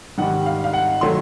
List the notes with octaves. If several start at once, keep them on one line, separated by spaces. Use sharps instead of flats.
G#2 D#3 G3 F#5
F5
F5
F#5
D#3 F#3 A3 C6